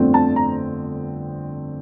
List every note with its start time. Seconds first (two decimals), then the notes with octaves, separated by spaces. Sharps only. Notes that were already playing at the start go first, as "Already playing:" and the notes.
Already playing: G1 F2 D3 A3 C4
0.14 A5
0.36 A#5